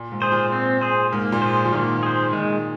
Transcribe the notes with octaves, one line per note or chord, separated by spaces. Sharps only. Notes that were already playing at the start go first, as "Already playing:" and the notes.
Already playing: A#2
G#2
G#4 C5
A#2
C4
G#4 C5
G#2 A#3
A#2
G#4 C5
F3
A#2 D#3 A#3
G#4 C5
A#2 D#3 G#3